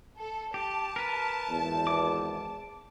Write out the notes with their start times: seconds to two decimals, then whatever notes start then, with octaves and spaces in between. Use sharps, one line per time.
0.18 A4
0.54 G4 A5
0.96 A#4 B4
1.49 G#1 E2
1.87 D6